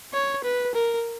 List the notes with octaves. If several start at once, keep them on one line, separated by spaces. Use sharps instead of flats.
C#5
B4
A#4